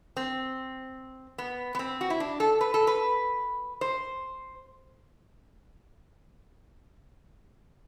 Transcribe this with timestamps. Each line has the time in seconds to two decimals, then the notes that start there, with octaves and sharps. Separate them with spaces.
0.17 C4
1.38 B3
1.75 B3
1.79 C4
2.01 F#4
2.10 E4
2.20 D4
2.40 A4
2.61 B4
2.74 A4
2.87 B4
3.81 C5